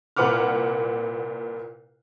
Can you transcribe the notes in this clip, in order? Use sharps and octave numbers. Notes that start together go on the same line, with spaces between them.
C2 A#2 B4 F#5 D6 F6